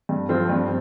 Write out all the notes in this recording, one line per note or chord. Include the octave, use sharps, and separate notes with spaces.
G2
F3 C4 F4
G2